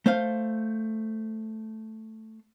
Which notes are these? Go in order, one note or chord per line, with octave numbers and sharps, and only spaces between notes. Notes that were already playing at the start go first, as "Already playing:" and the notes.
A3 C5 F5